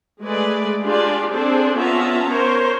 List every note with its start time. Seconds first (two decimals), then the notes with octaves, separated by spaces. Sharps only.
0.21 G#3 A3 G#4 B4 D5
0.83 D4 F4 G4 G#4 D5
1.33 C4 D4 G#4 A4 C5
1.78 B3 C#4 F4 E5 A5 A#5
2.31 A#4 C5 C#5